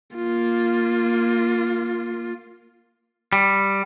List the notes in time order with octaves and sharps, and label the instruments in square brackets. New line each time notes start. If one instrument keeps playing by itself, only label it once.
[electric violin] A#3 F4
[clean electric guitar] G3